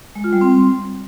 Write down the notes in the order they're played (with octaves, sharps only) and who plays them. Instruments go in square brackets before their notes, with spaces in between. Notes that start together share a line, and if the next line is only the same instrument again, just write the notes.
[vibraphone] G#3
F4
G3
C4